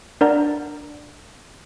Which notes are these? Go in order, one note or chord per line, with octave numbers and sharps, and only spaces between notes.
D4 A#4 D5 F#5 A#5